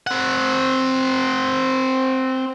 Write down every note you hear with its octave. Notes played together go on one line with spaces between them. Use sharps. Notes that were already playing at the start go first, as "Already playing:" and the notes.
C4 F#5